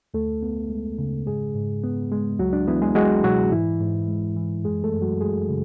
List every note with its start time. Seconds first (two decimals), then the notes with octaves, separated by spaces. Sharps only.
0.14 D2 A3 A4
0.43 B3
0.70 G#3
0.98 C#3
1.26 G#2 G#3 G#4
1.55 G#2
1.84 B3
2.12 G#3
2.39 C#2 F#3 F#4
2.53 D4
2.67 E3 B3 E4
2.82 G#3 G#4
2.95 F#3 G#3 F#4
3.24 B2 F#3 F#4
3.52 G#2 E3 E4
3.80 G#2
4.08 G#3
4.36 E3
4.64 F#2 G#3 G#4
4.83 A3 A4
4.93 F#2
5.02 F#3 F#4
5.20 G#3 G#4
5.49 C#3